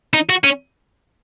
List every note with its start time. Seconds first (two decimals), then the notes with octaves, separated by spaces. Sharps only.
0.14 D#4
0.29 F#4
0.44 C#4